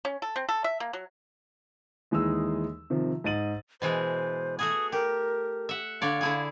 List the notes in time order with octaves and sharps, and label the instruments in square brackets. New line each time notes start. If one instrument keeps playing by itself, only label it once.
[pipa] C#4
A4
C4
A4
E5
A#3
F#3
[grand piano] D#2 E3 G#3 D#4 G#4 E6
C3 D#3 F3
G#2 D#5 A6 D#7 F#7
[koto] B2 E3 G#3 [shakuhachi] C5
[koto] A3 F#4 G#4 [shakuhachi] D#6
[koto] G4 [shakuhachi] A#4
[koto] E5 F#5
[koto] D3 C#5 D5 [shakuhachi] F5
[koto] D3 E4 G#4